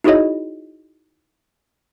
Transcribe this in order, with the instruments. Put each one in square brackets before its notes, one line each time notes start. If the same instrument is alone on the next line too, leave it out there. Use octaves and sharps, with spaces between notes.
[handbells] D#4 E4 F#4 G#4 C#5 D#5